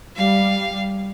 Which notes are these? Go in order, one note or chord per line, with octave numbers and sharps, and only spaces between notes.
G3 F5